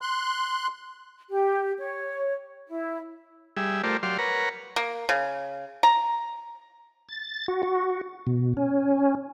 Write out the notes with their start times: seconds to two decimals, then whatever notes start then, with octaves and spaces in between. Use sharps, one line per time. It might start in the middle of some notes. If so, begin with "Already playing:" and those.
0.02 C6 F#6
1.29 G4
1.78 C#5
2.67 E4
3.57 G3 G#4 E5
3.84 A3 F4 G4 A#4 C5 D5
4.03 F#3 G4 D5 F5 C6
4.19 A#4 B4 C#5 F#5 A#5
4.76 A#3
5.09 C#3
5.83 A#5
7.09 A6
7.48 F#4
7.63 F#4
8.27 B2
8.57 C#4